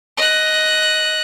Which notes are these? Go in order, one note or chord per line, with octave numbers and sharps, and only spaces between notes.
D#5 F#6